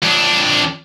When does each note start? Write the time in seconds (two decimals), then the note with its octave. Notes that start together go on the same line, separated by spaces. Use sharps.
0.02 F2 D4